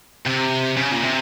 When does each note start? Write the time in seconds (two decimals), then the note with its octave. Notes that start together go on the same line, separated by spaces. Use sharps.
0.26 C3
0.77 C#3
0.92 A#2
1.04 C3